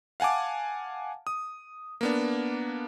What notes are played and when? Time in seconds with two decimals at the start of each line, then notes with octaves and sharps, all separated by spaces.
0.20 F5 F#5 G#5 A5 D6
1.27 D#6
2.01 A#3 B3 D4